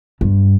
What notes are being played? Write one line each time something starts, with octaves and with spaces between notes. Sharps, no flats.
G2